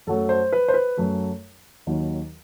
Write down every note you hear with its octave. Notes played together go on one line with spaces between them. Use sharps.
F#2 F#3 A3 A4
C5
B4
C5
B4
F#2 F#3 A3
D#2 D#3 F#3